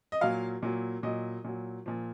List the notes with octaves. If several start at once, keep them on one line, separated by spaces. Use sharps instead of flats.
D#5
A#2 F#3 F5
A#2 F#3
A#2 F#3 D#5
A#2 F#3
A#2 F3